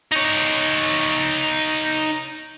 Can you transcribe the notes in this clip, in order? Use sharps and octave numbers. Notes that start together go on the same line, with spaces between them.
D#4 C#5